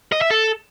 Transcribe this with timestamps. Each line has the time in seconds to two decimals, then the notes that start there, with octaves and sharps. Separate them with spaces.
0.12 D#5
0.21 E5
0.31 A4